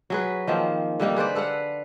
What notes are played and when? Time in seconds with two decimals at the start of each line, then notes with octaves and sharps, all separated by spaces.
0.10 F#3 G#4 B4
0.47 D#3 F3 A#3 C4
1.00 D3 G3 A#3 D#4
1.16 G#4 B4 C5 D5
1.35 A4 B4 F5 F#5